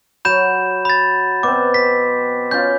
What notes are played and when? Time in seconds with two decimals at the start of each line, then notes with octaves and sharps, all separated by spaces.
0.25 F#3 F#4 B5 G6 E7
0.85 B5 A6
1.43 B2 C4 D6
1.74 B6
2.51 C#4 F4 G6